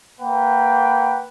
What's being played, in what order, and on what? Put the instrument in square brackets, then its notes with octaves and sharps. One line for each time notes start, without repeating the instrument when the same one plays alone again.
[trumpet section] A#3 B4 F#5 G5